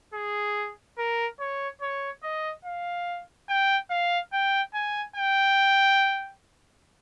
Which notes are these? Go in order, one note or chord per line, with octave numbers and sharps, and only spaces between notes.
G#4
A#4
C#5
C#5
D#5
F5
G5
F5
G5
G#5
G5